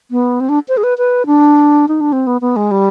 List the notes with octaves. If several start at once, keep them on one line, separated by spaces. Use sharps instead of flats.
B3
C4
D4
C5
G#4
B4
B4
D4
D#4
D4
C4
B3
B3
G#3
G3